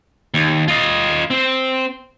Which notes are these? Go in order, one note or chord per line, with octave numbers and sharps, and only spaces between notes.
D#2
F4 D#5
C4